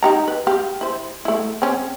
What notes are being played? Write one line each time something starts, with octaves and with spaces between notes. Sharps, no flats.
D#4 G4 A#5
B4
G4 F5
E4 C5
A3 E4
C4 C#4